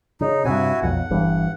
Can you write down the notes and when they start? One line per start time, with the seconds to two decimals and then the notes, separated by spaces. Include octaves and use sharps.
0.21 C#3 D#4
0.45 G2 C3 E4 F#4 G#5
0.82 B1 F2 F#5
1.10 G1 G2 E3